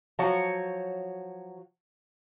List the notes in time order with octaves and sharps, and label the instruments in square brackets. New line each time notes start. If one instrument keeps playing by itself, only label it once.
[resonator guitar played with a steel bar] F3 F#3 F#4 C#5